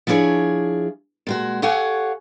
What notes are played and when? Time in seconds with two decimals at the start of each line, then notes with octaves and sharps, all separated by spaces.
0.07 F3 D4 E4 G#4 C#5
1.27 A#2 G#3 F#4
1.62 G4 A4 C#5 F5 F#5 G#5